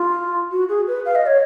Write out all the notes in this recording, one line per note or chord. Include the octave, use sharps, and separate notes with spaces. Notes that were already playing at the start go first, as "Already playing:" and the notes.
Already playing: F4
F#4
G#4
B4
F5
D#5
C#5